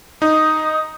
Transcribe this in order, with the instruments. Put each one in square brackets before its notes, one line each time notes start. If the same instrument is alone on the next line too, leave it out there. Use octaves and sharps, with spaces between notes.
[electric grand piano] D#4 [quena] D#6